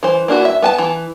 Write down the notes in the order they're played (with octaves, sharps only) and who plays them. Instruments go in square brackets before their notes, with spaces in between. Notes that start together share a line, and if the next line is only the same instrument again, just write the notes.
[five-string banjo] E3 C5
A#3 D4 E4 F#4
E5
B3 G#5 A5
E3